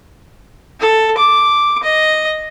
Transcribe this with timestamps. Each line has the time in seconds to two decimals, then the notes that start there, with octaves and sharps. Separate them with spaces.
0.80 A4
1.18 D6
1.83 D#5